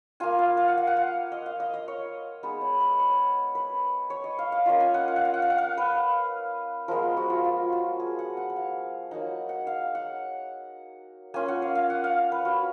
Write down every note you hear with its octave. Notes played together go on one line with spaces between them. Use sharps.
A#3 F4 G#5
F5
F5
F#5
F5
F#5
F5
D#5
F5
D#5
D#5
C#5
G#3 B3 D#4 B4
C#5
B4
C#5
B4
C#5
D#5
F5
F5
A#3 C#4 F4 D#5
G#5
F#5
F5
F#5
F5
F#5
F5
F#5
F5
B4
F3 G#3 B3 A#4
F#4
F4
F4
F#4
G#4
F#5
F#5
F#5
F5
F#3 A#3 D#4 F#5
F#5
F5
F#5
A#3 C#4 F4 G#5
F#5
F5
F5
F#5
F5
B4
F#4